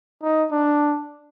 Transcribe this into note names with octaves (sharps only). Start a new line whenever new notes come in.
D#4
D4